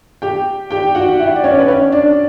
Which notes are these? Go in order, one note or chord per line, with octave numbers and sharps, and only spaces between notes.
G4 G5
G4 G5
F#4 F#5
E4 E5
D5
C#4 C#5
B4
C#4 C#5
D4 D5